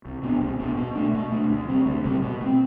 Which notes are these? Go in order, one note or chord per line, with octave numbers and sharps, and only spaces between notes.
C2
B2 B3 D4
C2
B2 B3 D4
B2
A3 D4
B2
A3 D4
D2
C3 G3 C4
D2
C3 G3 C4
B2
A3
C4